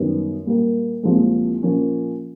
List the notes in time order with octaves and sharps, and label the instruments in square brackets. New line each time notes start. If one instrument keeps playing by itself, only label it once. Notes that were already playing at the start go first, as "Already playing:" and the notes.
Already playing: [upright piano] F#2 D#3 G3 B3
A#2 G3 A#3
C2 A#2 F3 G#3
A#2 F3 A#3 C#4